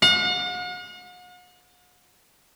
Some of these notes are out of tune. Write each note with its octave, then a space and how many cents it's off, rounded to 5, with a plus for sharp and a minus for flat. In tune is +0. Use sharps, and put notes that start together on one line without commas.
F#5 -45